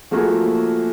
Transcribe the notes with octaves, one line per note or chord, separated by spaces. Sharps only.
F3 A3 A#3 F#4 G#4